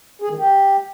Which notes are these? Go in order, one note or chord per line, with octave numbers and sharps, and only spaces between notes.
G#4
D#3
G4